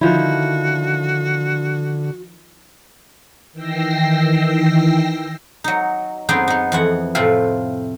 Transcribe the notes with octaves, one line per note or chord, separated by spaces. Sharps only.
D3 D#3 F3 E4 F#4
D#3 E3 G5 E6 A#6 C7
F#3 D#4
F#2 B3 C4 D#4 G#4 G5
B3 D#4
F2 E3 F#5
A2 C3 A3 C4 F4